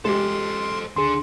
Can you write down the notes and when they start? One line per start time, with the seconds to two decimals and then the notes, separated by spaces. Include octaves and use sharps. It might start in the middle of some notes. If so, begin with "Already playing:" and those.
0.05 G#3 G4 A4 C5 C6
0.96 C#2 D3 G#4 C6